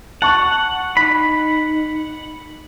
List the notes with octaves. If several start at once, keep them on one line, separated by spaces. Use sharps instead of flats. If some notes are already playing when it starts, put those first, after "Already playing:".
F#5 A5 C#6 F#6
D#4 B5 B6